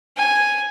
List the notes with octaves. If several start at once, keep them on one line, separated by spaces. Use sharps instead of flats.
G#5